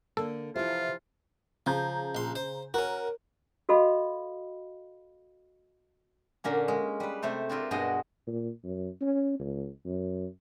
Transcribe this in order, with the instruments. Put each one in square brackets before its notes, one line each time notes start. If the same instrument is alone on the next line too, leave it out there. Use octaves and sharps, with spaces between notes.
[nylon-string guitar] D3 A#3 [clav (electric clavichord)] A4
[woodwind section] C3 E3 F3 [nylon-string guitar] E4 C5 [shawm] F4
[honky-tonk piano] C#3 A#5 G6 [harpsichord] F3
[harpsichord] A#1 C6
C5
[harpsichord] C#4 F#4 [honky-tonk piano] A#4
[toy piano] F#4 A4 D#5 F5 B5
[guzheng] A#2 D3 A#3 C#4
G#3
G3 B4
C3 A3 A4 C5
C4 D4 E4 F4 A#4
G2 B2 G#3 F#4 D#5 C6
[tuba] A#2
F#2
C#4
C#2
F#2